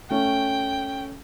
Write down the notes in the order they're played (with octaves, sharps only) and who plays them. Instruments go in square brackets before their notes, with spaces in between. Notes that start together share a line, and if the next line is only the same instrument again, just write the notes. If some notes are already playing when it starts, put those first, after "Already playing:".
[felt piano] A3 C#4 [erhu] G5